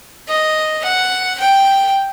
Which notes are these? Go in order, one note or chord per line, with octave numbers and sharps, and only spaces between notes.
D#5
F#5
G5